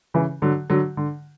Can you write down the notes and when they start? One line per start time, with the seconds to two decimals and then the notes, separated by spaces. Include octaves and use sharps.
0.14 C#3 E3
0.42 D3 F#3
0.70 D3 F#3
0.97 D3